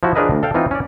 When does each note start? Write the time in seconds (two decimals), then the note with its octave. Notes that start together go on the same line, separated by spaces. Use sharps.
0.03 F3 E4 F#4
0.15 F3 D4 G#4 A#4 B4 D#5
0.31 D2
0.43 A4 F5 G5
0.54 E3 C4 D#4 F4
0.71 C#4 D5